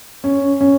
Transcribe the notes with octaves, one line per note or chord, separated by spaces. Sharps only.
C#4
C#4